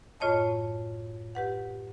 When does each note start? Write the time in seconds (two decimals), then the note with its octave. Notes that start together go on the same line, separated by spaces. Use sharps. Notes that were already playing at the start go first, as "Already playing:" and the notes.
0.20 F#2 A2 F4 C#5 D#5 A5
1.35 G4 B4 F#5